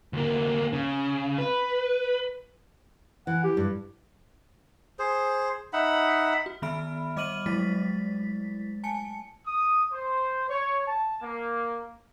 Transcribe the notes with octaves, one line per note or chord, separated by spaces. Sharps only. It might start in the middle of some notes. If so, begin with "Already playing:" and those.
D2 A#3
C#3
B4
E3 F#5
G4
G2
G#4 C5
D#4 E5 F#5 B5
F#4
D#3 B3 E5 B5 F6 D7
G3 D#5 D6 F6 D#7 F#7
F#3 G#3 A3 E4 A6 B6
G#5 A5 C#7
D#6
C5
C#5
A5
A#3